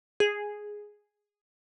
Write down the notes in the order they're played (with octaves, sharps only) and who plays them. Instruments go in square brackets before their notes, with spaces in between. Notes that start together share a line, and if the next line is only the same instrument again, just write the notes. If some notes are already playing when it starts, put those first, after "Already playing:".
[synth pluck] G#4